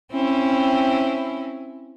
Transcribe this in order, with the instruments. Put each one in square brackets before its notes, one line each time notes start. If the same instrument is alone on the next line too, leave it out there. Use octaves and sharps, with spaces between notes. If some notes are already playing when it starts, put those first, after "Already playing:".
[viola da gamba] C4 C#4 E4